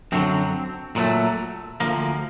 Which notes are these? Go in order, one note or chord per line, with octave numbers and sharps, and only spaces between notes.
F#2 D3 F#3 C4
A#2 F#3 A3
D2 D3 F3 A#3